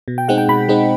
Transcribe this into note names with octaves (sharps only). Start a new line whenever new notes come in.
B2
G5
G#3 C4 D#4 F#5
G5
B2 B5
G#3 C4 D#4